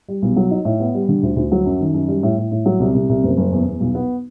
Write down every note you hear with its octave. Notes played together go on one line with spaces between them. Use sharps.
G3
B1
F#3
D#4
A2
B3
G3
D3
D2
D2
F#3
F#2
D#3
F#2
G3
A2
A2
A2
F#3
C2
C2
C2
F#1
F#1
E2
E2
B1
B3